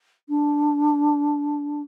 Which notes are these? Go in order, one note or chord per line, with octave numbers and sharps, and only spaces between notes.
D4